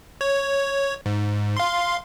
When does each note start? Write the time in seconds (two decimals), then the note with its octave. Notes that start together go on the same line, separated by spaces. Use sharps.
0.21 C#5
1.06 G#2
1.57 F5 C6